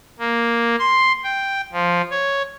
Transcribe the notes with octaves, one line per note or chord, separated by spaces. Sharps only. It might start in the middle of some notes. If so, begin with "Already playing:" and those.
A#3
C6
G5
F3
C#5